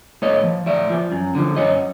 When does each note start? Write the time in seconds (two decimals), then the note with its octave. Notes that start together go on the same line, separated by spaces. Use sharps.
0.22 A2 C#5 D#5
0.44 F3
0.66 A2 D5 E5
0.90 F3
1.12 F#2
1.35 D3 F3
1.56 F#2 C#5 D#5